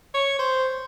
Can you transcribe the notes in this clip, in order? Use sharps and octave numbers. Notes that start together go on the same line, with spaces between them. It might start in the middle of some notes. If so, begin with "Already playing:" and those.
C#5
C5